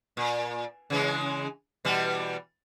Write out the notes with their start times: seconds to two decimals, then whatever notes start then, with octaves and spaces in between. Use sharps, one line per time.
0.17 A#2
0.90 C#3 E3 G#3
1.85 B2 E3 G3